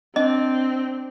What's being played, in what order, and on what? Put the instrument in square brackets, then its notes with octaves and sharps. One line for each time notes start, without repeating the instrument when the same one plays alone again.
[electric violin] C4 [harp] D4 [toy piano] D#5